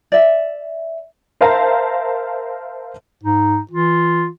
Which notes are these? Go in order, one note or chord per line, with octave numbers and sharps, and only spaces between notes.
D5 E5
A#4 C5 E5 F5 A5 A#5
G#2 D#4
E3 F4